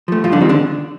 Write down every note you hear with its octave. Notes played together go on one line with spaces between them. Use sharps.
F3 A3
G2 F3 F4
D3 D4
D#3 G3 C4
D3 D4